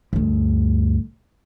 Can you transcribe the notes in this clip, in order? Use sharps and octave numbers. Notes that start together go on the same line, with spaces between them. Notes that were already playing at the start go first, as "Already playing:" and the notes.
D2 G2